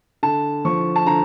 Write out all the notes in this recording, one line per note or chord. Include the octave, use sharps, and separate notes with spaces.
D3 A5
F3 C#6
A5
D3 A#5